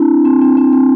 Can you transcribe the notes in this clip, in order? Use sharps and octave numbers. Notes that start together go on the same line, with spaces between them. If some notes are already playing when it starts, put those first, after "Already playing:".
Already playing: C4 D4 E4
C4
C4
C4
C4